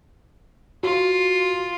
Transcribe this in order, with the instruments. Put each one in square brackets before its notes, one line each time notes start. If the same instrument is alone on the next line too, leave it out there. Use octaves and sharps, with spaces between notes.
[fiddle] F4 [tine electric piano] F#4